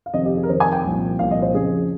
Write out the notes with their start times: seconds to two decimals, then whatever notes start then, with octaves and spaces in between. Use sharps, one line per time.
0.06 F5
0.14 F2 C3 D#3 D#5
0.25 G4
0.37 G#4
0.43 A#4
0.49 F2 C3 D#3 C5
0.60 G#5
0.73 G5
0.84 C2 A#2 F3
1.19 C2 A#2 F3 F5
1.31 D#5
1.42 C5
1.54 F2 C#3 F3 G#4